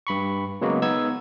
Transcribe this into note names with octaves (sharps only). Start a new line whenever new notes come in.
G2 B5 C#6
C#3 F#3 G#3 A#3 B3 F#4
B3 D#4 E6 G#6